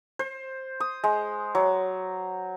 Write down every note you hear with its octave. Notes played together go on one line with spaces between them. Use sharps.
C5
D#6
G#3
F#3